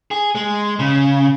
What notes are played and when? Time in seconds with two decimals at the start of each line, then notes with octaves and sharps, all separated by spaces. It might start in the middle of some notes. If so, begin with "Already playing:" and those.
0.11 G#4
0.35 G#3
0.79 C#3